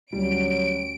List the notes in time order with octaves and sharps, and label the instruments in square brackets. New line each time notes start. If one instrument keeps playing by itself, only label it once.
[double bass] D2 C#4 [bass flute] F#3 [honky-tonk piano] G3 [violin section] D7